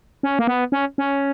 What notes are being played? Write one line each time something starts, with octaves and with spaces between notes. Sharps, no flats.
C#4
A#3
B3
C#4
C#4